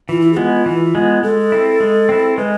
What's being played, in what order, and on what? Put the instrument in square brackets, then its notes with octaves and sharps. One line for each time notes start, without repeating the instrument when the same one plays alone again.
[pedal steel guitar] E3 [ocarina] F4
[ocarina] E4
G#4
[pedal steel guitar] G#3 B3 [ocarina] F4
[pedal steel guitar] E3
G#3 B3
[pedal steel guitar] G#3 [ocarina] A4
[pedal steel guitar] C4 E4
G#3
C4 E4
[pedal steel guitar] G#3 [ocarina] B4